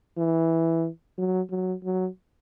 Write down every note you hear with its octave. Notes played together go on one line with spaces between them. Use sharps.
E3
F#3
F#3
F#3